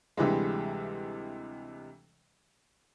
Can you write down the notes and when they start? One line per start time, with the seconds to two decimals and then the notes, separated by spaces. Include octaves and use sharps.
0.17 D2 C3 E3 G3 G#3